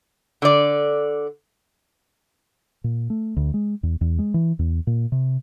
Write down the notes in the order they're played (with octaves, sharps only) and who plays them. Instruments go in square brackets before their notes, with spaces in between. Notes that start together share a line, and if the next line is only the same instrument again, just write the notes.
[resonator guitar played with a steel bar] D3 D5
[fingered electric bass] A#2
A3
D2
G#3
E2
E2
G#3
E3
E2
A#2
C3